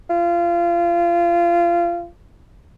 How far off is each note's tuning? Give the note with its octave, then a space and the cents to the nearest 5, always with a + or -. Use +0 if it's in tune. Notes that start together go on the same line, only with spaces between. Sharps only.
F4 -25